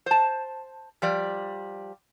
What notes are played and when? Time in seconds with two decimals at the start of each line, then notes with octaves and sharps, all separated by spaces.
0.06 C5 A5
1.02 F3 G3 D5